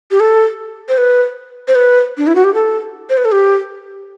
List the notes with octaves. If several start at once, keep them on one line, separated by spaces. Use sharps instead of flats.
G4
A4
C5
B4
C5
B4
D4
E4
F#4
G4
A4
C5
B4
A4
G4